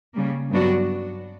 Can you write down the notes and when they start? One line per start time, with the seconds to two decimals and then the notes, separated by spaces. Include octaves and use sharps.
0.14 C#3 G3 A#3
0.50 G2 F#3 B3 D4 F#4